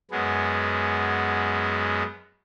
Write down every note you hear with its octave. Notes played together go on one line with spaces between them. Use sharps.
F#2 G#3 B3